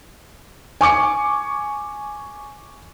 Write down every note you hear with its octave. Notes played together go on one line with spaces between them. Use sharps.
G#5 C#6 D6 C#7